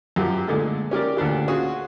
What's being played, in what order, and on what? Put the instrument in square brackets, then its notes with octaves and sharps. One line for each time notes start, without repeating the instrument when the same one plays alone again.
[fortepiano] F#2 F3 G4
A#2 D3 G#3 A3
C#4 G4 A#4 D5
D2 A#2 D4 G4
C#4 F4 F#4 G#4